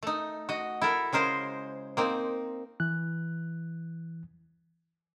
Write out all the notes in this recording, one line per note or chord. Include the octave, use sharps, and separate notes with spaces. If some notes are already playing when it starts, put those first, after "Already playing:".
A3 D#4
F#4 D#5
E4 A4 A#4
C#3 G#3 A#4 C5
A#3 C4 D#4
E3 F#6